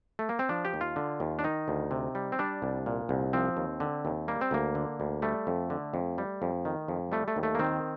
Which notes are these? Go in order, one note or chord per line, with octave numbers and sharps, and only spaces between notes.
A3
A#3
C4
F3 D4
G4
D#2
F4
D3
D#2
D4
D#3 D#4
D2
C3
G3
C4
G3 D4
C2
A#2
C2
F3 C4
D#2
D3
D#2
G3 A#3
C4
D2 A#3
D3
D2
G3 A3
F2
D3
F2
G3
F2
D#3
F2
G3 A3
A3
D#2
A3
A#3
D#3 C4